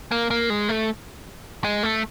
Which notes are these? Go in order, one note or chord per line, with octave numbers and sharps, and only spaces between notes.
A#3
A#3
G#3
A3
G#3
A3